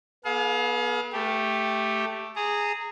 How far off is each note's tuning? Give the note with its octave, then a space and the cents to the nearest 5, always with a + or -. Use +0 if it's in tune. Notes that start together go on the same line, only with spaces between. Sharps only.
B3 -30 G#4 +35 F5 +20
A3 +0 G4 +0
G#4 +0 A#5 -25